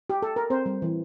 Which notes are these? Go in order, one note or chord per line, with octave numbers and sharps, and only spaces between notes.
G4
A4
A#4
C4 C5
G3
E3